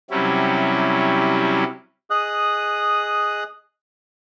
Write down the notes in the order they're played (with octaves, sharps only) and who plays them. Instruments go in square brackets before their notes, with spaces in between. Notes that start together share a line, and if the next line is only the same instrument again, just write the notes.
[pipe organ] C3 F#3 G3 C#4 E4
[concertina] G#4 D#5 D#6 F#6